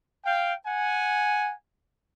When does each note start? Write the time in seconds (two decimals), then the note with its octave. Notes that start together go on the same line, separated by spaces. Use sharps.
0.25 F5 G5
0.66 F#5 G#5